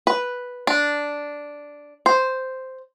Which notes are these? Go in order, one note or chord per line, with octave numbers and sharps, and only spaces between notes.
B4
D4
C5